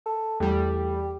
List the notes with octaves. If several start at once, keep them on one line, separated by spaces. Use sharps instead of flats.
A4
E2 G3 A3 G4